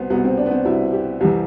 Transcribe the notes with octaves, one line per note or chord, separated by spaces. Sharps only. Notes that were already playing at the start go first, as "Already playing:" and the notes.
Already playing: C2 B2 B3 C4
C2 B2 B3
C4
D4
B3
C4
C2 B2 E4
G4
C2 C3 E3